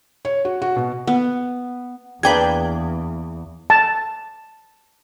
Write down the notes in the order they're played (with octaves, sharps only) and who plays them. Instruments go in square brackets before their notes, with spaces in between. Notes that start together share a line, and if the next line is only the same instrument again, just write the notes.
[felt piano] C#5
F#4
F#4
B2
[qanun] B3
[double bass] E2 [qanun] A#3 D4 G#4 [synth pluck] B4 G5 G#6
[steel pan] A5